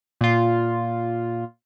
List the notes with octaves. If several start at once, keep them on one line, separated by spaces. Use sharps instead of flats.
A#2 F4